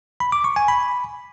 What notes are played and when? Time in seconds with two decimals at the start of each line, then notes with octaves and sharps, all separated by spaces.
0.20 B5
0.32 D6
0.44 C#6
0.56 G#5
0.68 B5